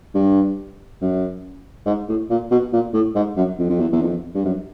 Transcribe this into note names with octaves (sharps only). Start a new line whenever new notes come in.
G2
F#2
G#2
A2
A#2
B2
A#2
A2
G#2
F#2
F2
F2
E2
E2
F2
G2
F#2